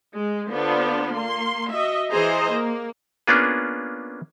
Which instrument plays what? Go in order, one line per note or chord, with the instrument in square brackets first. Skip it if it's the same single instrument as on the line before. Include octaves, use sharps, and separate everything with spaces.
[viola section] G#3
D3 B3 D4 F4 C5
A#3 C6
F#4 D#5 E5
E3 G#4 C5 D#5 A#5
A#3
[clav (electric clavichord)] A#3 B3 C#4 D4 F4 G#4